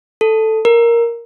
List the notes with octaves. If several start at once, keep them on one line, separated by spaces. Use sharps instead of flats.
A4
A#4